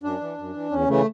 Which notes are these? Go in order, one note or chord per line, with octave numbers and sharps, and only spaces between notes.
F#2 D4
E3
F#2
E3
E2 C#4
C#3 E3 A3